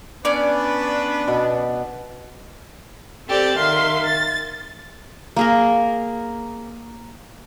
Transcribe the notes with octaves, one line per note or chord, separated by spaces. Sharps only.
B3 C#4 D4 B4 D5
B2
C4 G4 A4 D5
D#3 E5 F5 C6
A6
A#3 G#4 A#4